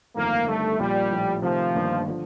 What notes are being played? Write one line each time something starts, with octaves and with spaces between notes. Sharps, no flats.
G1 F2 D#3 A3 A#3
G1 G2 D#3 G3 A3
A#1 A#2 F3 G3 A#3 F4
A#1 A2 F3
C3 D#3 F3 A3
G1 G2 D#3 A#3
D3 F3